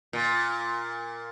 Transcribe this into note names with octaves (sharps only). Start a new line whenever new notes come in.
A#2